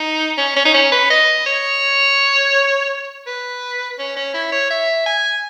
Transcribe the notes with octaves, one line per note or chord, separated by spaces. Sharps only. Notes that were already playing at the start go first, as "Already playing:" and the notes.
Already playing: D#4
C#4
C#4
D#4
C#4
B4
D#5
C#5
B4
C#4
C#4
E4
C#5
E5
G#5